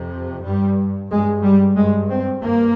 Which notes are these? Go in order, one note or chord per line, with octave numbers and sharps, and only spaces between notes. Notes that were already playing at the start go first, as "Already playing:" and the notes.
Already playing: F2 C3
G2 G3
G2 G#3
G3
G2 G#3
C4
G2 A#3